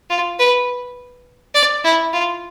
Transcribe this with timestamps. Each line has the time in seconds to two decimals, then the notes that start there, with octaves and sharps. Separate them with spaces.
0.10 F4
0.39 B4
1.55 D5
1.85 E4
2.13 F4